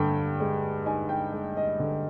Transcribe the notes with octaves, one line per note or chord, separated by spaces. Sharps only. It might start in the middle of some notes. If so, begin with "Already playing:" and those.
Already playing: G2 D3 G5
G#3
D#4 G#5
G5
G#3
D#5
D3